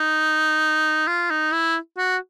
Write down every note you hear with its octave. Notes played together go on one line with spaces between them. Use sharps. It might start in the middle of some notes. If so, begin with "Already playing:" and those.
Already playing: D#4
F4
D#4
E4
F#4